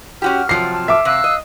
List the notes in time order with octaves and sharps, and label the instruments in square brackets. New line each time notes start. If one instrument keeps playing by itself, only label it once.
[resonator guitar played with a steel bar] C#4 F#4 G4 [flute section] F6
[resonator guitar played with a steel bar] C3 F3 F#3 [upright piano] C7
[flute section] A5 F6
[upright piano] E5 D6
[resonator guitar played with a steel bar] C3 [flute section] F5 E6 F#6
[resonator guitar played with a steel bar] D#5